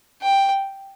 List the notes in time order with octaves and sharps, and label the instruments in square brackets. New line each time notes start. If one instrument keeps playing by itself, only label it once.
[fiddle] G5